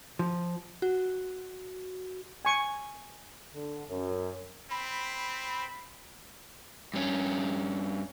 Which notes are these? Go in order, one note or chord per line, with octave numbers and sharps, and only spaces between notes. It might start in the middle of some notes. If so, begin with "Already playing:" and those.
F3
F#4
G#5 C#6
D3
F#2
C4 B5
G2 C#4